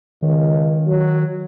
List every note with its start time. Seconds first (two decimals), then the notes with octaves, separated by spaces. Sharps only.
0.22 C#2 D#3
0.87 F#3